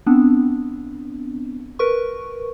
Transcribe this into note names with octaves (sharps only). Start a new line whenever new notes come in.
B3 C4 D4
A#4 B4 C#6